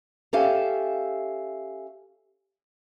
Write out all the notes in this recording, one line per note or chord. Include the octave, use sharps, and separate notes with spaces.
C#4 G4 A4 E5 F5 G#5